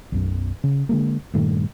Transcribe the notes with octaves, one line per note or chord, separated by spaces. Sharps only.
B1 F#2
C#3
D3 G#3 A#3
G2 A#2 D#3 A3